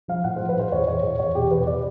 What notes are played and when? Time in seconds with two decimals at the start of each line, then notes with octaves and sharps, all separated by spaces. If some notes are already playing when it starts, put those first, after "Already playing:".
0.08 F3 F5
0.24 A2 F#5
0.36 C5
0.40 F3
0.49 B4
0.56 A2 C5
0.72 E2 C#5
0.88 E2 C#5
1.03 E2 C#5
1.19 E2 C#5
1.35 B2 G4
1.51 E2 B4
1.67 D5